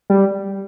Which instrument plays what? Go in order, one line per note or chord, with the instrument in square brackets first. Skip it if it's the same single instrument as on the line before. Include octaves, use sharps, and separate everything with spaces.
[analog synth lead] G3